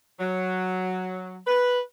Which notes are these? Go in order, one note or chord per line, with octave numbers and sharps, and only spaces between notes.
F#3
B4